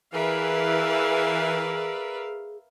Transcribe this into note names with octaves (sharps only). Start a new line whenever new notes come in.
E3 G#4 A#4 B4 D5 E5 F5